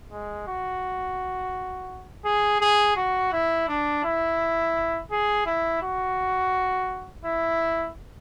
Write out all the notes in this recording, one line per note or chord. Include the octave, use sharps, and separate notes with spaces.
G#3
F#4
G#4
G#4
F#4
E4
D4
E4
G#4
E4
F#4
E4